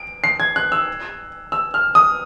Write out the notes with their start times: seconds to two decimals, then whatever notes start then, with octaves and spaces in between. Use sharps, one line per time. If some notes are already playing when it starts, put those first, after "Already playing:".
Already playing: D7
0.24 C7
0.40 G#6
0.56 F#6
0.72 E6
1.52 E6
1.74 F6
1.95 D#6